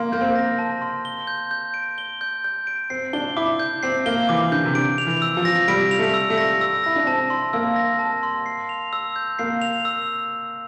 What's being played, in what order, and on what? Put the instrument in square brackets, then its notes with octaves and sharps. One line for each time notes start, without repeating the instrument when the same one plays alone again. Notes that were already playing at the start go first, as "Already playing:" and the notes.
Already playing: [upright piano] A#3 [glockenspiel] C6
[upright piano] A#3 [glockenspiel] G6
[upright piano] C4
A#3
[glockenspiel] A#6
A5
C6
G7
G6
G6
D7
G7
G6
G6
D7
[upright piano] C4 [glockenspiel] C7
[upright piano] D4 [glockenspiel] G7
[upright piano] E4 [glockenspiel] D6
[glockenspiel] G6
[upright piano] C4 [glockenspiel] C7
[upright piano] A#3 [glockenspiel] G7
[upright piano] E3 [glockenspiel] D6
[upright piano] D3 [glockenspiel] G6
[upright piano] C3
[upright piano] D3 [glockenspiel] D7
[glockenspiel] F7
[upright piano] E3
[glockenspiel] E6
[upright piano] F3
[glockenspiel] A#6
[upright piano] G3 [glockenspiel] D7
[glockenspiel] F7
[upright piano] A3
[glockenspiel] E6
[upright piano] A3
[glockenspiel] A#6
E6
[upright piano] E4 [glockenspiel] A#6
[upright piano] D4
[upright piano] C4 [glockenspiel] A5
[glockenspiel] C6
[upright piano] A#3 [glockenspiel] E6
[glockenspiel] A#6
A5
C6
C7
F7
E6
G6
[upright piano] A#3 [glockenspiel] C7
[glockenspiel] F7
E6